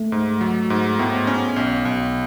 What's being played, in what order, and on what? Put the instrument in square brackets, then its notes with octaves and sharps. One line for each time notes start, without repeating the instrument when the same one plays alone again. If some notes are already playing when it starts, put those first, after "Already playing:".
Already playing: [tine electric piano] A3
[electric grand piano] G#2
F#3
G#2
[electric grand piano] A2 [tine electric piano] B3
[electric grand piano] C#4
B1
B1